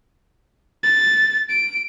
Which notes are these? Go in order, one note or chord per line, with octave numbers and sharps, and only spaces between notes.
A6
D7